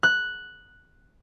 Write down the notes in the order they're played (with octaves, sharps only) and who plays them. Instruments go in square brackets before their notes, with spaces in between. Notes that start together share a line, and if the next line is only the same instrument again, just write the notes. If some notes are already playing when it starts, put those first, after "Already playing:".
[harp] F#6